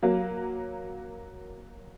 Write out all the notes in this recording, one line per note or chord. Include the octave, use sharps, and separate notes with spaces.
F#3 A#3